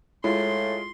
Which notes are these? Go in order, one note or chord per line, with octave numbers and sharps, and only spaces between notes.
A2 G#3 E4 F4 C6